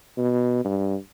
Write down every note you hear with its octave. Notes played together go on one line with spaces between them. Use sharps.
B2
G2